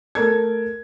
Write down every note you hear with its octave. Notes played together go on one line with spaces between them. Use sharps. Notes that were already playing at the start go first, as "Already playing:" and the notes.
A3 A4 A#4 G#6